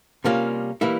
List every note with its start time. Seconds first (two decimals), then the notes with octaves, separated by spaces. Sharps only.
0.24 C3 G3 A#3 C#4 F4
0.81 E3 G3 A#3 E4